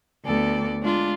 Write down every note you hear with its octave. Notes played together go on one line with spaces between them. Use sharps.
D2 B3 A4 D5
G#3 D4 F4